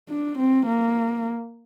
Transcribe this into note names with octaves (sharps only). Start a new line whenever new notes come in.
D4
C4
A#3